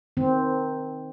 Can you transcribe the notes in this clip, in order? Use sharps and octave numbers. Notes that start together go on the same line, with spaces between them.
D#3 C4